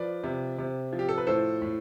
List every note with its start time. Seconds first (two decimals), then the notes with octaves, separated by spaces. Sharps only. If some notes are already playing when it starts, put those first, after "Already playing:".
Already playing: F3 B4 D5
0.24 C3
0.58 C3
0.93 F3
0.99 G4
1.09 A4
1.18 B4
1.27 A2 A4 C5
1.62 A2